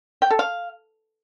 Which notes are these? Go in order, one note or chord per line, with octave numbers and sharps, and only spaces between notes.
G5
A4
F5